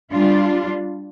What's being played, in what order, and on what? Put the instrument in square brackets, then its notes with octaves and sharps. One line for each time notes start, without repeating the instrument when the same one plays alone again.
[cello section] G3 D4 F4